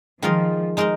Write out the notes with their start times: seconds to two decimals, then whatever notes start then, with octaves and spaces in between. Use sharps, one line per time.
0.22 D#3 F3 G#3 F4 A#4 D#5
0.77 G#3 D#4 A#4 D#5